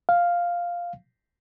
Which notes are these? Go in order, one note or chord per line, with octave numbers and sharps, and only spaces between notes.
F5